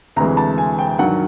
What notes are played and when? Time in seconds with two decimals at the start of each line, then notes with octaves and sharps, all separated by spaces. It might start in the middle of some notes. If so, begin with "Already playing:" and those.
0.16 D2 C3 E3 G#3 A#5
0.37 A5
0.58 G#5
0.79 G5
0.99 G2 D#3 F#3 F#5